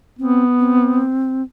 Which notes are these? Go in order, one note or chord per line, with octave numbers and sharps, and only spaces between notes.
B3 C4
C4